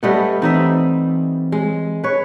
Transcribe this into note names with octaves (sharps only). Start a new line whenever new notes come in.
G3 A3 B3 C#4 D#5
E3 G3 C4 D#4 D#5 E5
G#3
B4 C#5